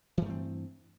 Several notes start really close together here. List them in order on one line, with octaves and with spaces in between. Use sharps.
E3 G2 A3 C4